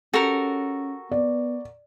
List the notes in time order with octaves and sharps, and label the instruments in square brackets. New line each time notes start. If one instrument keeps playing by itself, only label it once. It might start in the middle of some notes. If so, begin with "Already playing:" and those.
[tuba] C#4 [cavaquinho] F#4 A#4 [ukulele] G4 A4
[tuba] B3 [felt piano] D5